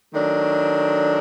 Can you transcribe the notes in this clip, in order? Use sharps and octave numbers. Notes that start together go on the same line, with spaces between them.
D#3 F#3 A3 D4